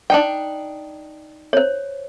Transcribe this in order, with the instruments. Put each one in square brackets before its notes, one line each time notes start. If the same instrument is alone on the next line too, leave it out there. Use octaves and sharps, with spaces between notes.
[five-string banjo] D4 D#4 G5
[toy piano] C5 C#5